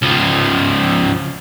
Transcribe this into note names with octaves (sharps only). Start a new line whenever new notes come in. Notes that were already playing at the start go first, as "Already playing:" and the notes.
C#2 F3